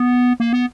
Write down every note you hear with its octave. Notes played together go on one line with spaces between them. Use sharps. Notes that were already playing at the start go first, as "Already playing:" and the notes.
Already playing: B3
A#3
B3